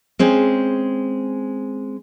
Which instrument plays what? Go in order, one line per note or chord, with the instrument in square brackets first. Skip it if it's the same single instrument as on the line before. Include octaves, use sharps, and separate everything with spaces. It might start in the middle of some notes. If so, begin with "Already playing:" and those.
[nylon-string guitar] G#3 C4 C#4